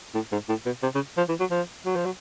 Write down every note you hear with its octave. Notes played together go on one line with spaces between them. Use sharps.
A2
G#2
A2
B2
C3
C#3
F3
E3
F#3
F3
F#3
F3
F#3